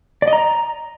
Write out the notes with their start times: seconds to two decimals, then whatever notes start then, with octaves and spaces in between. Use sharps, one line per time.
0.22 D5
0.28 D#5
0.33 A#5